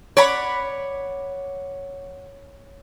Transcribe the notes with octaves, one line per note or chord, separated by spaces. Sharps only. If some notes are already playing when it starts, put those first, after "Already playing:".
C#5 D5 F#5 B5